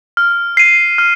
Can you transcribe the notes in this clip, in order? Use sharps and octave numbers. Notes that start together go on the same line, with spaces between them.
F6
C7 D#7
F6